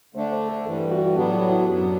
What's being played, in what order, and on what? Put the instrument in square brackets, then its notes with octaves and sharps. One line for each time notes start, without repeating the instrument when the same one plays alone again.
[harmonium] D3 A3 D4 [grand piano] C5
[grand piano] C5
A4
[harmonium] G2 E3 G3 [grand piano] A4
[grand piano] F#4
F#4
[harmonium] A2 F#3 B3 D4 [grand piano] G4
[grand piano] F#4
E4
[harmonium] F#2 F#3 B3 D4 [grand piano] G4